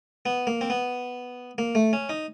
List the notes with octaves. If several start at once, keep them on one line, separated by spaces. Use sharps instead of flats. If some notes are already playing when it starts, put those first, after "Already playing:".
B3
A#3
C4
B3
A#3
A3
C#4
D#4